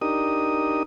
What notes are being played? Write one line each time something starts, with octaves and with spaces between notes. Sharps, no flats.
D4 D#4 G4 A#4 D#6